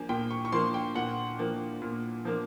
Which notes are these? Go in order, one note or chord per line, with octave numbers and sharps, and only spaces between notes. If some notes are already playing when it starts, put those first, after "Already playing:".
Already playing: F3 A#3 D4 G#5
A#2 G5
C#6
C#6
F3 A#3 D4 C6
G5
A#2 F#5
F3 A#3 D4
A#2
F3 A#3 D4